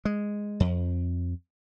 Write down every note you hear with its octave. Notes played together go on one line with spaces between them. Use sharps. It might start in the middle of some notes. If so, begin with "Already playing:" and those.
G#3
F2